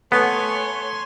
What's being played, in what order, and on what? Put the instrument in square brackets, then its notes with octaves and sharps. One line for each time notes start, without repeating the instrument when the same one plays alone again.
[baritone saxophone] A3 [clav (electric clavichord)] B3 [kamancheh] C#5 [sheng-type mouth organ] G#5 C6